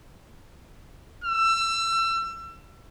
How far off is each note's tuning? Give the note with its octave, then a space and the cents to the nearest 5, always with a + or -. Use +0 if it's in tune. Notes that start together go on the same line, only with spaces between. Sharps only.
E6 +30